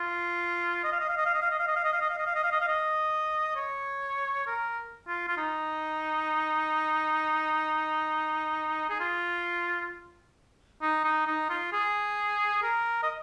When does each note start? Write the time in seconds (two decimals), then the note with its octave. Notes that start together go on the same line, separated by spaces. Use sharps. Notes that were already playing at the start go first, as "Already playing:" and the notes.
Already playing: F4
0.83 D#5
0.92 F5
1.00 D#5
1.09 F5
1.17 D#5
1.25 F5
1.34 D#5
1.42 F5
1.51 D#5
1.59 F5
1.67 D#5
1.76 F5
1.84 D#5
1.93 F5
2.01 D#5
2.10 F5
2.18 D#5
2.26 F5
2.35 D#5
2.43 F5
2.52 D#5
2.60 F5
2.68 D#5
3.56 C#5
4.47 A#4
5.07 F4
5.28 F4
5.37 D#4
8.89 G#4
9.00 F4
10.81 D#4
11.04 D#4
11.27 D#4
11.49 F4
11.73 G#4
12.63 A#4
13.03 D#5